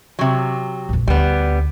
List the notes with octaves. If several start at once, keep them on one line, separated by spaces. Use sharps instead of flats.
C3 F#3
A#1 F2
D2 G3 B3